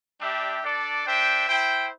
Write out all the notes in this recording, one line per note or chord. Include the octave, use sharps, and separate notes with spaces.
G3 D4 G4 E5
D4 A4 D5
D4 C5 E5 G5
E4 C5 G5